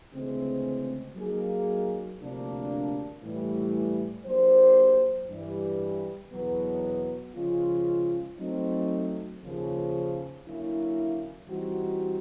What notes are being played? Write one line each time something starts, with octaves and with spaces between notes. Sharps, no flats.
D2 C#3 E3 G#3 C4
F#3 A#3 D#4 G#4
D2 C3 F3 A#3 D4
A2 E3 G3
F#3 A#3 D4 G4 C5
G2 E3 G3
E2 B2 F#3 B3
C#3 F3 G#3 C#4 F4
F#3 A3 C4 D#4
D#2 C#3 F3
D3 F#3 A#3 C#4 E4
E3 G3 C4 D#4 F#4